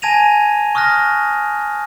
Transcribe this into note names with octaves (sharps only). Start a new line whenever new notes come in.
G#5 A5 G#6 A#6 D#7 F7
C#6 D#6 F6 F#6 A#6